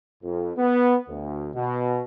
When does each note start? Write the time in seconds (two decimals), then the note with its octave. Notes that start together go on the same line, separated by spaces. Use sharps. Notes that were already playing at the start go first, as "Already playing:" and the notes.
0.23 F2
0.58 B3
1.08 D2
1.54 B2